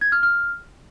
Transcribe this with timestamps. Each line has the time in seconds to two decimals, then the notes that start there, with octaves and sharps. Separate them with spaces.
0.01 G#6
0.12 F6
0.23 F6